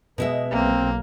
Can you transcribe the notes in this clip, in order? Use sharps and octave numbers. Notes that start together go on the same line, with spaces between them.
B2 G#3 B3 E5
B1 A#3 C4